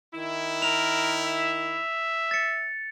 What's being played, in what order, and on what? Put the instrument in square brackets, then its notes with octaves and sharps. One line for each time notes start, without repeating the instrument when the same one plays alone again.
[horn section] D#3 E4
[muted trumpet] A#4 [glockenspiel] F7
[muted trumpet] E5
[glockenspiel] A6 C#7